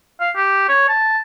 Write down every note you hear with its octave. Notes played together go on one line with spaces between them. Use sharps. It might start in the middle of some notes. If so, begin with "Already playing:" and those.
F5
G4
C#5
A5